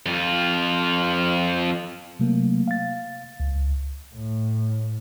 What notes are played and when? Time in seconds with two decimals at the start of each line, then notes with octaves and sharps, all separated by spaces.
0.06 F2 F4
2.20 C3 F#3 A3 A#3
2.68 F5 A6
3.40 C#2
4.14 A2